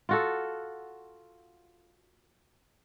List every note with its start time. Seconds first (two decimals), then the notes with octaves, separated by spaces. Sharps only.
0.09 F4 F#4 A4